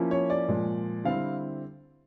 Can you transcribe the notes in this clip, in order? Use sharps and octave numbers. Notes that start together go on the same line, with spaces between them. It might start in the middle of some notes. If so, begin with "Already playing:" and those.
Already playing: F3 A#3 C#4 E4
C#5
D5
A#2 F3 G#3
D3 G3 C4 E4 F5